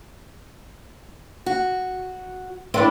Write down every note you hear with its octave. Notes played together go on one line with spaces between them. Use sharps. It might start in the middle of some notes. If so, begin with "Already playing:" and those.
F#4
A3 C4 D4 E4